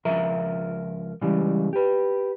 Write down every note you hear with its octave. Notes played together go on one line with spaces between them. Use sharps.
C#2 F3 A#4 E5 A#5
C#3 E3 G3 G#3
G4 B4